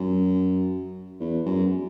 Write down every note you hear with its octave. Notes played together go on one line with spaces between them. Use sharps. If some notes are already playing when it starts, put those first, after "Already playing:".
Already playing: F#2
E2
F#2